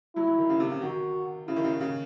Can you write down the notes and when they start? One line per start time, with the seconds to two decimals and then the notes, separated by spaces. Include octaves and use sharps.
0.16 F#3 E4
0.27 F#3
0.38 D#3
0.50 C#3
0.60 C3
0.71 C#3
0.82 D#3 F#4
1.48 C#3 E4
1.56 D#3
1.64 C#3
1.81 C#3